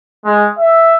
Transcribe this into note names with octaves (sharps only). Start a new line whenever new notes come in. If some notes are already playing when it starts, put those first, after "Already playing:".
G#3
E5